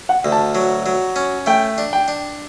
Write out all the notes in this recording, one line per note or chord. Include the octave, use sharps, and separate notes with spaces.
F#5
D2
A5
F#3
F#3
C#4
A3 G5
D4
G5
D4